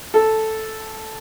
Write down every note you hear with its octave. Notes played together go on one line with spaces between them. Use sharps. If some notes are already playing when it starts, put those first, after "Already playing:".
A4